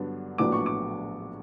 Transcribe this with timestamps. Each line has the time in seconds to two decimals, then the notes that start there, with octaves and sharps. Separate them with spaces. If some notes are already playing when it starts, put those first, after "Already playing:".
Already playing: G2 D3 F#3 B3 D4
0.38 A#1 A2 F#3 B3 D4 D6
0.52 C#6
0.66 D6